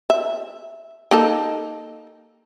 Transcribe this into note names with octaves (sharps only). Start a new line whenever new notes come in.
E5
A#3 D#4 A4